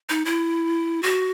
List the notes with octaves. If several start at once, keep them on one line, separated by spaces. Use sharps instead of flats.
D#4
E4
F#4